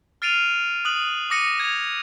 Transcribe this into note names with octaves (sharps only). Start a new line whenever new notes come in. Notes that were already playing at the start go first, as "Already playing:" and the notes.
F6 A6 C7 D7 D#7 F7
D#6 F#6 F#7
D6 D#6 A#6 C#7 D#7
G#6 F7